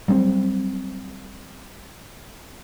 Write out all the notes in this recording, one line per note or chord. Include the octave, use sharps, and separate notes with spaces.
F#3 G3 B3 C4